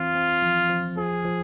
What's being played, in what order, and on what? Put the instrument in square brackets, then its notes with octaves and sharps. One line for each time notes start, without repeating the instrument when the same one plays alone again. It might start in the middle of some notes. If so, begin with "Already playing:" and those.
Already playing: [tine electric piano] E3 C4 [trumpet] F4
[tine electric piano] C4
F3
F3
[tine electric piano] F3 [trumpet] G#4
[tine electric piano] F3